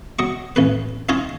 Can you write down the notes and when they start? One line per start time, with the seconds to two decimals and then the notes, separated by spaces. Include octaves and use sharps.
0.19 F#3 D#5 C#6
0.56 A1 C#4 B4
1.09 C#4 D#4 F4 C#5 D#5 G#5